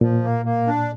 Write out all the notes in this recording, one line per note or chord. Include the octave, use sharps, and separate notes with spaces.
A#2 F3
A#3
A#3
D4